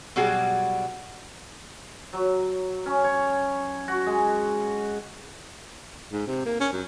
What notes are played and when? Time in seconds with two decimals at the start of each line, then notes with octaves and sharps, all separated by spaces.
0.16 B2 F#3 G3 F#4 G#4
2.13 F#3
2.86 C#4
3.04 C#5
3.88 F#4
4.06 G#3
6.12 G#2
6.27 C3
6.46 A#3
6.60 C#4
6.73 F#2